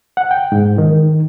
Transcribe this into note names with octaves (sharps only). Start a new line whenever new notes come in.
F#5
G5
G#2
D#3